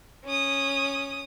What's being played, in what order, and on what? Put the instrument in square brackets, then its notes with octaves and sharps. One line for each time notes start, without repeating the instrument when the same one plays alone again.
[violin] C#4 D#6